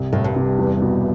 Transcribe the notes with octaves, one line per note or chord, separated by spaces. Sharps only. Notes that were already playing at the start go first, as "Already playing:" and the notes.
Already playing: C2 C3
C2 A2
G2
C3
E2
B2